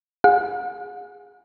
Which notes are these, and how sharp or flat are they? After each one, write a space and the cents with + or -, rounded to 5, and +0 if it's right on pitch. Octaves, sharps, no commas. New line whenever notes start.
G#4 -15 F#5 -45